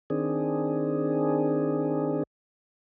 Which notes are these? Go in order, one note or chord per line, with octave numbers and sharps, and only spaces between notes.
D#3 C4 D4 G#4